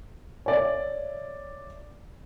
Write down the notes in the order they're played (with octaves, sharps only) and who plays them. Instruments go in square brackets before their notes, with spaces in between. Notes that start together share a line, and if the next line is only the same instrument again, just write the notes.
[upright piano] C#5 D5 E5